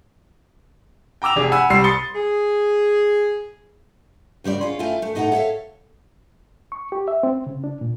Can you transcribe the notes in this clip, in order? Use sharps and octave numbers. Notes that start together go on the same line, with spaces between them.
G5 A#5 D6 E6 F7
F1 D4 G#4
F#5 G#5 B5 E6
C2 G3 C6 E6 C7
C6 D#6 A6 C#7 G7
G#4
C#3 G3 C4 D5
C#4 F4 G#4
A3 C4 E4 F4 G#5
A3
A2 D#4 E4 A4 F#5 A#5
A4 C#5 E5 F5
C#6
G4
E5
C4
C#3
D4
A#2